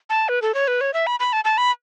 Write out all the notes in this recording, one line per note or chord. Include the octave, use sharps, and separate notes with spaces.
A5
B4
A4
C#5
B4
C#5
E5
B5
B5
A5
A5
B5